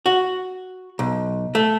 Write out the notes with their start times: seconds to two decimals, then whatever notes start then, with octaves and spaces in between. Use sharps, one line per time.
0.06 F#4
0.99 B1
1.55 A3